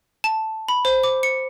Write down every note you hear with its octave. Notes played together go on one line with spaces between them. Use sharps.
A5
B5
C5
D6
C#7